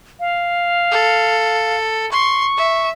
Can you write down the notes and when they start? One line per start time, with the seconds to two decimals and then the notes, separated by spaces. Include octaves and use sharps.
0.20 F5
0.91 A4
2.12 C6 C#6
2.57 E5